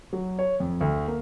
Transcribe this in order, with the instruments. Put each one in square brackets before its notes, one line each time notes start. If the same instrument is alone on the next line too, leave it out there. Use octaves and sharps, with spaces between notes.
[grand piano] F#3
C#5
F2
D2
A#3